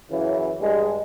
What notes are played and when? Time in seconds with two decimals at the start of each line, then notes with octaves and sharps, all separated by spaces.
0.10 F#2 C#3 E3
0.60 G2 G#3